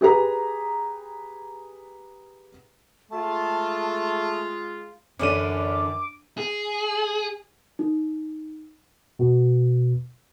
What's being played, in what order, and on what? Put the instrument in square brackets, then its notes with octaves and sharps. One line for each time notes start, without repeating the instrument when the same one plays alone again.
[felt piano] G4 G#4 B4 A#5
[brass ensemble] G#3 F4 [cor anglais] A3 [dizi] A5
[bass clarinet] F#2 [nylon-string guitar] D3 E3 [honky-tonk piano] C#4 D4 D#7 [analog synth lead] D6
[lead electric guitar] G#4
[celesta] D#4
[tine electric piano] B2